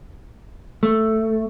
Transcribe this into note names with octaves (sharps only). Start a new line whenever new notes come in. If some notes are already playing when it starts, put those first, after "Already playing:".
A3